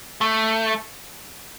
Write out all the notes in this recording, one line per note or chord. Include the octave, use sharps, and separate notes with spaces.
A3